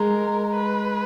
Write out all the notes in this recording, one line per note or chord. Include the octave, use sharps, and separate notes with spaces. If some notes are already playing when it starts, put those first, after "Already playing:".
Already playing: G#3 A#4
B4